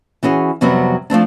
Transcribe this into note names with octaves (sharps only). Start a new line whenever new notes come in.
E3 C#4 F#4 G#4
F2 C3 F#3 G3 B3 C4
F3 A3 C4 D4